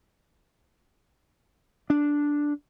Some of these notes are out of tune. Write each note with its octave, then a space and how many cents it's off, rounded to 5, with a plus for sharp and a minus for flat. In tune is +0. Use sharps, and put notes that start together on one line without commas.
D4 -5